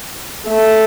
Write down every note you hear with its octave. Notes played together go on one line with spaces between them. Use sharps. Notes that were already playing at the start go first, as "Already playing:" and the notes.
A3